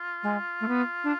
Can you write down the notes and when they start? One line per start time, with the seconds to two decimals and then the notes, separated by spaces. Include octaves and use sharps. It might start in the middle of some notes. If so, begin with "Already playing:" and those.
Already playing: F4
0.23 G#3
0.61 A3
0.68 B3
1.04 D4